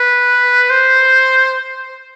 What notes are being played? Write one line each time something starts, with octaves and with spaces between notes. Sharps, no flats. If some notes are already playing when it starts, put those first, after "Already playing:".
Already playing: B4
C5